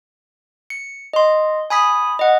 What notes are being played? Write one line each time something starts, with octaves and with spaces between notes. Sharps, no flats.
C#7
D#5 C6
G#5 B5 D#6 B6
D#5 F#5